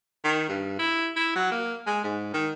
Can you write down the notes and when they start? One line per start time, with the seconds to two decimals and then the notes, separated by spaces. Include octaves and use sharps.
0.24 D#3
0.49 G2
0.79 E4
1.16 E4
1.35 F#3
1.51 A#3
1.87 G#3
2.04 G#2
2.33 D#3